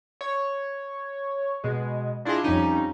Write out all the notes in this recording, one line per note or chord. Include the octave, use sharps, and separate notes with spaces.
C#5
B2 G#3
D4 E4 F4 G#4 D#5
F2 G3 C#4 D#4